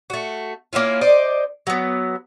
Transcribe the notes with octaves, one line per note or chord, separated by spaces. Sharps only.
A3 F#4
A#3 C#4 E4 F4
C5 D5 D#5
F#3 B3